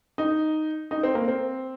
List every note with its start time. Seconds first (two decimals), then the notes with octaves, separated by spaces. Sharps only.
0.18 D#4
0.91 D#4
1.03 C4
1.15 A#3
1.28 C4